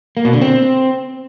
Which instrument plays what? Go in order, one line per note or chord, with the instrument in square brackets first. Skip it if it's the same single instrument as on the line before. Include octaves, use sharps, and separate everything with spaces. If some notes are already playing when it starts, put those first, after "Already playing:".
[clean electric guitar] A#3
B2
D3
C4